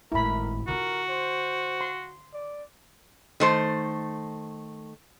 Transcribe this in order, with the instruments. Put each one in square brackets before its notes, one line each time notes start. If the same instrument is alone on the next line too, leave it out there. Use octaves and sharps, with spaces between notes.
[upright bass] G#1 A2 [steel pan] E4 B5 [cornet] A#4
[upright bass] D3 F4 [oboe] F#4 [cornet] A#4
[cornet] C5
[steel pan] C6
[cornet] D5
[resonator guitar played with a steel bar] D#3 A3 C5